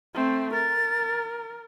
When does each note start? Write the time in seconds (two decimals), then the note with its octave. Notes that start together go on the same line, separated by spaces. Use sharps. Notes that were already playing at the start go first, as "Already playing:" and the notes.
0.14 A3 C4
0.53 A#4 A6